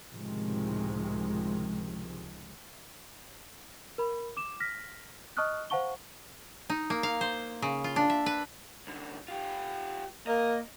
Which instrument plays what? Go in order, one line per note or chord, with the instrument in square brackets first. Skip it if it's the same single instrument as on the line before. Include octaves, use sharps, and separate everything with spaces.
[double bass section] C#2 A2 C3 D#3 F3 G#3
[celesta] A#4 B5
D6 E7
F6 A#6 B6
D#5 A5 C#6 D#6 F6 F#6
C5 F5 F#5 A5 C#6 G7
[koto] D#4
A#3
F5
C5
C#3
F4
D4
E5
B4
[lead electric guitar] C2 D3
F4 G4
[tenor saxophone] A#3 [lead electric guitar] D#5